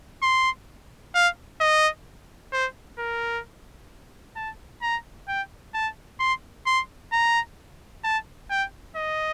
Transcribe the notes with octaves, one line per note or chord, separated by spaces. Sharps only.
C6
F5
D#5
C5
A#4
A5
A#5
G5
A5
C6
C6
A#5
A5
G5
D#5